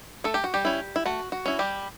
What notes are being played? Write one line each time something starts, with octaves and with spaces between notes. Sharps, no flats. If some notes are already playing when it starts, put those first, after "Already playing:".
A3 A4
G4
F#4
G3 G4
C#4 E4
E4
A3 F#4
F#4
C#4 E4
G3 G4